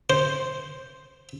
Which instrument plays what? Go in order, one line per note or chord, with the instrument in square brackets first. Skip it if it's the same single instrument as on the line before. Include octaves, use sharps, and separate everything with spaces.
[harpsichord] C5